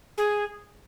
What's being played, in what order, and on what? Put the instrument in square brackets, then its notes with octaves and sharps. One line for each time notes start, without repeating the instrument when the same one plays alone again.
[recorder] G#4